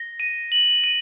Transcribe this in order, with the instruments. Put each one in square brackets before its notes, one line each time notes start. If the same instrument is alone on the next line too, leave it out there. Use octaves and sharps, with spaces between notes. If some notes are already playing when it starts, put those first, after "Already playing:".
Already playing: [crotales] A#6
D#7
F#7
D#7